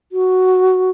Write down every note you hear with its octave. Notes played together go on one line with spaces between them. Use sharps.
F#4